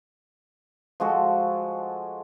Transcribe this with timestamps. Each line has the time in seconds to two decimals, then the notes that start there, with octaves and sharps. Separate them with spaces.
1.00 F3 G#3 F#4 A4